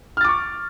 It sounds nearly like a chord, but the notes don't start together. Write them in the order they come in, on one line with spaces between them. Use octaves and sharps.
F6 A6 D6 C#6